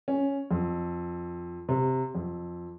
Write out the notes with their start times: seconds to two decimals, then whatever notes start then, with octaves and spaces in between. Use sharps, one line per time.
0.08 C#4
0.51 F2
1.69 C3
2.15 F2